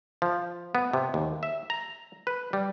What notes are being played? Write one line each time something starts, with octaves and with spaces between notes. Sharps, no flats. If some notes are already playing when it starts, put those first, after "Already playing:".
F3
B3
C3
D#2
E5
A#5
B4
G3